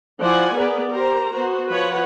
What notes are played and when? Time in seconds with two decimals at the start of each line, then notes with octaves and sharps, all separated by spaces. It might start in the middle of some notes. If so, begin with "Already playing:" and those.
0.21 F3 E4 C5 D5 F#5 G#5
0.56 B3 G#4 A#4 B4 D5
0.92 G4 A#4 C5 A#5
1.33 B3 F#4 C5
1.72 F3 B4 C#5 F#5